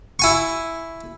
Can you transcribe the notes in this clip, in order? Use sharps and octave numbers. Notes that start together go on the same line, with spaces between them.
E4 G#5 C#6